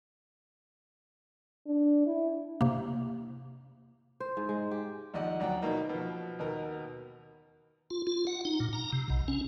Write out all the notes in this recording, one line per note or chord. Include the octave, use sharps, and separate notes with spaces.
D4
E4
C3 A#3
C5
G#2
G#3
G4
A#1 D#2 D5 D#5 F#5
D2 F#3 D5 F#5 G5 A#5
B2 D#3 A#3 D#4
B2 F3
D#2 B2 A#4
F4
F4
F#5
D#4
A#2
A#5
C3
B1
C#4